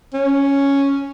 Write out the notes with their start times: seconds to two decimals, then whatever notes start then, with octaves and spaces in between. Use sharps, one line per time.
0.14 C#4